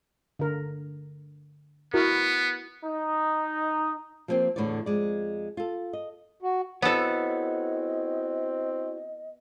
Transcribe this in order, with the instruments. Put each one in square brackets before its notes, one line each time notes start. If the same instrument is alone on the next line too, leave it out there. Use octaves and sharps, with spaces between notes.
[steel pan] D3 A#4
[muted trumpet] B3 [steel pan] E4 F#4 A#4
[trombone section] D#4
[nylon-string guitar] F3 G3 A#3 C4 F4 G4
E2 A2 D3 E3 C#5 D5
F2 G#3 D5
F4 A4
D#5
[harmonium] F#4
[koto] B3 A4 [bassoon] C4 [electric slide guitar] E4 F#4 C#5 [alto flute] D#5